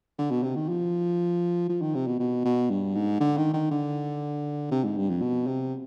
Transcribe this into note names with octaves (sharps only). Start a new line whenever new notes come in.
D3
B2
C3
D#3
F3
F3
D#3
C3
B2
B2
B2
G2
G#2
D3
D#3
D#3
D3
C3
G#2
G2
F2
B2
C3